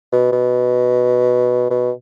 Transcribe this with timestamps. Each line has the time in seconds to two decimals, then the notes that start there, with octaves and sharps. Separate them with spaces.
0.12 B2
0.32 B2
1.70 B2